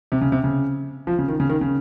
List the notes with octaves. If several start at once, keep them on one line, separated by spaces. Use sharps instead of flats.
C3
C#3
C3
C#3
F3
C#3
D#3
C#3
D#3
C#3